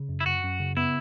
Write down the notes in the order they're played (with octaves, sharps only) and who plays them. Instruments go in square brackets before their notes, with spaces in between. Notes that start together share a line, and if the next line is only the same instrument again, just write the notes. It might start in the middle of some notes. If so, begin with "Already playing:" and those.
Already playing: [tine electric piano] C#3
F#2
[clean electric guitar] E4
[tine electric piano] F#2 [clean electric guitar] F#4
[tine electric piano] F#2
C#3
[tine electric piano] B3 [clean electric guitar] E4